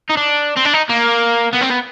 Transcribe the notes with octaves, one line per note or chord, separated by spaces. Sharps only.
D#4
D4
C4
D4
D#4
A#3
B3
C4
B3